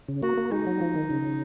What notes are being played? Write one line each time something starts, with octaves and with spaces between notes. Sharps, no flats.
C#3
A#3 F#4
A#3
G#3 D#4
F#3
F3
D#3
C#3